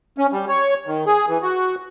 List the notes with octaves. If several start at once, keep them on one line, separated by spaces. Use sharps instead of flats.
C#4
G3
C#5
D#3
G#4
E3
F#4